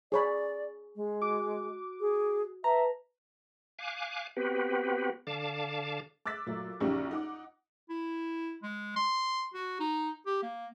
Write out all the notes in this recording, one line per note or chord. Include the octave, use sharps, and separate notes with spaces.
G#4 C#5 D5 B5
G#3
F#4 D6
G#4
B4 E5 A5 A#5
F5 G#5 D6 F#6
B3 C4 F#4 G4 B4
D3 F5 A5 D6
D6 E6 F#6 A6 B6
A#2 F#3 A3
A#1 F#2 C#3 D#4 G4 C#6
D#4 F#5 D6
E4
G#3
C6
F#4
D#4
G4
A#3